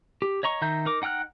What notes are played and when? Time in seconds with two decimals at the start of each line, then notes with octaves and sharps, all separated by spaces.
0.22 G4
0.43 C#5 D#5 A#5 C#6
0.62 D#3 D#4 E5 A#5 G6
0.85 D#4 A#4 D6
1.02 D#4 F#5 G5 F6 F#6